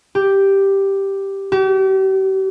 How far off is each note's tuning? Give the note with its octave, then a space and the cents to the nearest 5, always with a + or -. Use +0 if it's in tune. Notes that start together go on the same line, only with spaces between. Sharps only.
G4 +0
G4 -40